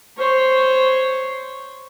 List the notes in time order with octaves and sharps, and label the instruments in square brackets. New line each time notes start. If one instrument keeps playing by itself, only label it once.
[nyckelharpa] C5 C#5